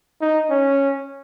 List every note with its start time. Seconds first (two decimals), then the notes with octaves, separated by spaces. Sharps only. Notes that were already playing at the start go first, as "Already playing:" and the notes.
0.21 D#4
0.50 C#4